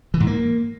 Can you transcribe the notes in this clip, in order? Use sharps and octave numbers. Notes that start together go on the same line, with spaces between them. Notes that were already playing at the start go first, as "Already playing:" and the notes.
E3
G#2
A#3